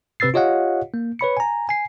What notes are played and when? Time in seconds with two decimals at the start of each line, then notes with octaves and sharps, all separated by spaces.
0.20 C3 C4 B4 E6 A6 C7
0.34 F4 G4 C#5 D#5 F5 F#5
0.94 A#3
1.19 B4 C#5 B5 C#7
1.37 G#5 A#5
1.69 G#5 C7